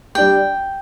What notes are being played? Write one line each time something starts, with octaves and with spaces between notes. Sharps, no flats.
G3 D4 G4 G5